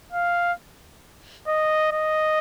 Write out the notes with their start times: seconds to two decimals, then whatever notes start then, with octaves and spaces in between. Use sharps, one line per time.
0.12 F5
1.47 D#5
1.92 D#5